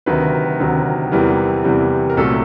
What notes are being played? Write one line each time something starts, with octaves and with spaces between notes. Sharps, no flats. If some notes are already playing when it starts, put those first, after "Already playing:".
D2 C3 D#3 F#3 B4
D2 C3 D#3 F#3
E2 C3 E3 G3 A#4
E2 C3 E3 G3
A#4
C2 A#2 F#3 A3 A4